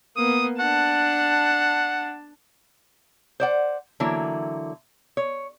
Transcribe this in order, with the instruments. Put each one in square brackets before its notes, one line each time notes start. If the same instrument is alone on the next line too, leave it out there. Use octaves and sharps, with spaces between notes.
[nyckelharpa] A#3 B3 [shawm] D#6
[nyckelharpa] D4 A5 [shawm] F#5
[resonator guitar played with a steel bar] C5 D5 F#5
D3 E3 F#3 A#3 E4
C#5